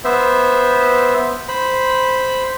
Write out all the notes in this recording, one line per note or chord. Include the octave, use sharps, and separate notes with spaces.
B3 C5 E5
C5 B5